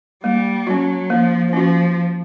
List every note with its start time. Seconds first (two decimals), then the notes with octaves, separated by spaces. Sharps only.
0.24 G3 A#3
0.67 F#3 C#4 F#4
1.10 F3 A#3
1.53 F3 C#4 F#4